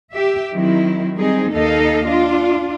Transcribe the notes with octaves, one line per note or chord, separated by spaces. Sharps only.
G4 E5
D#3 F#3 C4 E4
G3 C4 D#4 G#4
D#2 A#3 D#4 A4 D#5 F5
D4 F4